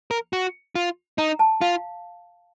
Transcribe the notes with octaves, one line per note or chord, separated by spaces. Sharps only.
A#4
F#4
F4
D#4 A#5
A5
F4 F5